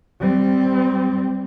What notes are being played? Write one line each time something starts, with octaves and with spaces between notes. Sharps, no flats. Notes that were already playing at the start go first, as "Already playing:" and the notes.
G3 C4